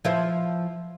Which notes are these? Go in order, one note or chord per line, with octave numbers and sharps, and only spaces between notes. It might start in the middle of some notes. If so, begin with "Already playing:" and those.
F3 E4 C5